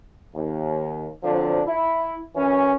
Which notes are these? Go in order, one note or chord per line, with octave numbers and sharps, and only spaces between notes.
D#2
D3 F3 F#3 C4 D4
E4
F#2 E3 C#4